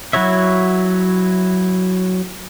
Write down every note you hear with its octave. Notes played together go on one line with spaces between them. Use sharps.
F#3 E4 F#4 C#5 E5